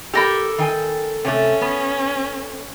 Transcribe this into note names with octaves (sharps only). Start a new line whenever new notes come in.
G4 A4 A#4 B5
D#3 G5 G#5
C3 A3 C#4
B3